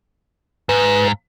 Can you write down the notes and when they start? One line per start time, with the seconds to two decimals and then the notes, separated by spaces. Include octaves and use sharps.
0.69 G#2 B4